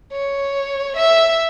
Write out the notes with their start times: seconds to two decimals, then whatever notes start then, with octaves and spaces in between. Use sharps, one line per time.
0.13 C#5
0.97 E5